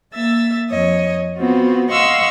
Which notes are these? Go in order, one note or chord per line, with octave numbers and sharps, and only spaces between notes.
A#3 E5 E6 A6
F2 C#5 D#5
B3 C4 F4 F#4
D#5 F5 F#5 C6 C#6 E6